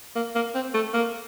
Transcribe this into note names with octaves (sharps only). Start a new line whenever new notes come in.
A#3
A#3
C4
A3
A#3